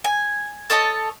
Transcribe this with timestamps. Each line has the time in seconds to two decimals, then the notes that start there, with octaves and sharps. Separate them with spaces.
0.04 G#5
0.70 A4 C#5 D#5 A5